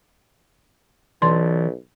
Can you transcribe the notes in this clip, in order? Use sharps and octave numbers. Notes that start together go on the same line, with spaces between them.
B1 E3 D5 A5 C6